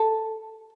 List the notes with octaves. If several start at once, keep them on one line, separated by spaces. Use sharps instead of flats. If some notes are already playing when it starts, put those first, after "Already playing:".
Already playing: A4